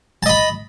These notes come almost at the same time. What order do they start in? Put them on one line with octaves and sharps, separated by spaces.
A5 D#5 B5